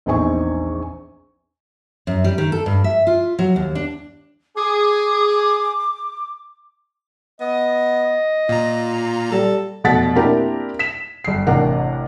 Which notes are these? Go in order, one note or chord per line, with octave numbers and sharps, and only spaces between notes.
A#1 E2 C4 D#4 G#5 C#6
F#2
G3
D#3
A4
G2
E5
F4
F#3
D#2
D4
G#4 D6
B3 D#5
A#2 F4 A#5
G3 A4
F1 B2 A3 F#5 A6 B6
A#3 C4 D4 E4 G4 A#4
B6 E7
G1 C7
A1 C3 D4 A#4 F#5